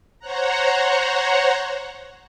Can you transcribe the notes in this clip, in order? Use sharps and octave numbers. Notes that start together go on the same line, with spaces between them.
C5 C#5 F#5 A#5